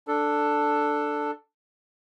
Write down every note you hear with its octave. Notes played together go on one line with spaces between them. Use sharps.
D4 A4